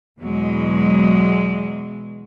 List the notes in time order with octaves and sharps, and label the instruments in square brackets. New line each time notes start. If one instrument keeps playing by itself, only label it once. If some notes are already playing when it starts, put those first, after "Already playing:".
[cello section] E2 B2 F#3 G#3